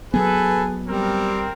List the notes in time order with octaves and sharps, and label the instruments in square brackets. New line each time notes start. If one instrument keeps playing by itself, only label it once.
[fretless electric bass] F#3 B3 [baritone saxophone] G#4 [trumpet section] A4 B4
[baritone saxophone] G3 [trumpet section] C4 A#4